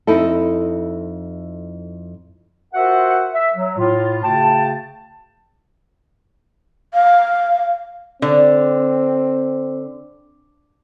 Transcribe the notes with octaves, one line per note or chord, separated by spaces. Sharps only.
F2 D#4 E4 A4
F4 F#4 A#4 C5 E5 F#5
E5
F#3
A2 F4
C#3 A3 F#4 G5 A5
F5
D3 C4